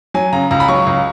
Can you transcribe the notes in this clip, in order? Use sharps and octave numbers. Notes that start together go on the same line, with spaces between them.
F#3 G#5
C#3 A#5
C#2 A#5
B5
F#3 C#6
C#2